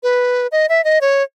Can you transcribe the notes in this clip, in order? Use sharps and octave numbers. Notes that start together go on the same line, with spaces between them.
B4
D#5
E5
D#5
C#5